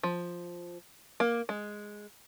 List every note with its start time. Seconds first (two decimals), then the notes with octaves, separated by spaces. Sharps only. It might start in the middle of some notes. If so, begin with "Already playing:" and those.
0.03 F3
1.20 A#3
1.49 G#3